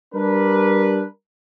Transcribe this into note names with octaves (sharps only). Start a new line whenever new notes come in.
G3 D4 A#4 B4